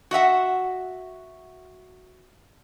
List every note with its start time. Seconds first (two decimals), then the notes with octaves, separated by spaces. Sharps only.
0.11 F#4 D#5 E5 F#5